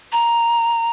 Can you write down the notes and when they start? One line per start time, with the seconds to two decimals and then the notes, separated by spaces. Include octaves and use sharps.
0.12 A#5